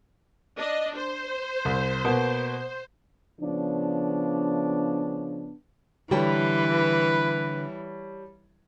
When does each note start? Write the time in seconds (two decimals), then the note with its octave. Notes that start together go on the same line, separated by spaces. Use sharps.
0.57 D4 D#5
0.97 C5
1.65 C2
2.05 B2 A#3 B3
3.41 C#3 F3 B3 D4
6.11 D3 E3 G3 B4 C#5 G5 A5